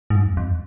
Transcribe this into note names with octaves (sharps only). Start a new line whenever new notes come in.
G#2
G2
F2
F2